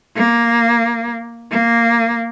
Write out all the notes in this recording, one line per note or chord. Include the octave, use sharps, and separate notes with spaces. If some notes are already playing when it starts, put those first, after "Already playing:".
A#3
A#3